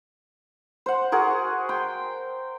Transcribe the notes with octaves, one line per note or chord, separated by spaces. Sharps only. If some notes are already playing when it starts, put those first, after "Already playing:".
C5 F#5
F#4 G#4 A#4
G5 C6